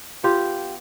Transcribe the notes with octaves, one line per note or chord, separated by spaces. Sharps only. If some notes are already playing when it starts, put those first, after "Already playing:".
B3 F4 G4